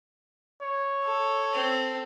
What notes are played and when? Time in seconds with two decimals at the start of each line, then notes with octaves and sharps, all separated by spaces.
0.62 C#5
1.05 A4
1.53 C4